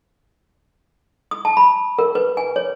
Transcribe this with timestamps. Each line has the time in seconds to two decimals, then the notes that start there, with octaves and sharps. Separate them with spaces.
1.31 D#6
1.45 A5
1.57 B5
1.99 A#4
2.15 B4
2.37 G#5
2.56 C#5